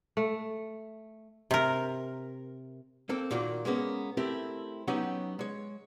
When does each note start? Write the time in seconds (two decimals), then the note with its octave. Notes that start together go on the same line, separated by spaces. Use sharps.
0.17 A3
1.51 C3 A#4
3.09 A#3 C4 A4
3.31 A#2 D#3 A#3 F4 F#4
3.65 G#3 A#3 B3 C#4
4.17 A3 C4 E4 G4 A#4
4.88 F#3 B3 C#4 D#4 G4 F#5
5.39 G#3 C#5